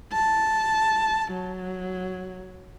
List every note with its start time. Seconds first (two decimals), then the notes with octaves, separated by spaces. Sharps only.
0.13 A5
1.32 F#3